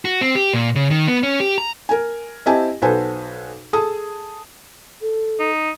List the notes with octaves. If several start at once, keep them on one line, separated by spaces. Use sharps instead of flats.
F#4
C4
G4
A#2
C#3
D#3
B3
C#4
G4
A#5
A#4 G#5
C4 E4 G4 D#5 G#5 A5
B1 F#4 A4 B4 C5 G#5
G#4 A4 A5 D#6
A4
D#4